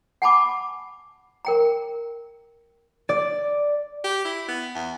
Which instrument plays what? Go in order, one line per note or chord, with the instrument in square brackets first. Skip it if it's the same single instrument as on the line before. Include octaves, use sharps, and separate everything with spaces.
[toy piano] F#5 G#5 A5 B5 D6
A#4 G5 A#5
[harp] D5
[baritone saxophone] G4
E4
B3
E2